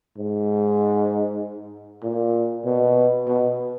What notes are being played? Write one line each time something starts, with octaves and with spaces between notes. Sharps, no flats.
G#2
A#2
B2
B2